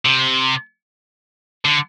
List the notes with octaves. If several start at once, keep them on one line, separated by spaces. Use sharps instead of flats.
C3
D3